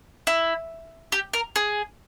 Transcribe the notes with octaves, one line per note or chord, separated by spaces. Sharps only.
E4
G4
A#4
G#4